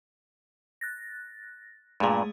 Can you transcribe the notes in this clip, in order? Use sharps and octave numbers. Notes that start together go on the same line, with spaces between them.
F#6 A6 A#6
G2 A#2 G#3 A3 G#4